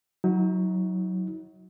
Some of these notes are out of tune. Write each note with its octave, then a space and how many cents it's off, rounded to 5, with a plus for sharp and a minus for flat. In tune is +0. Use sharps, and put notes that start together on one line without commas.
F#3 +0 D#4 +45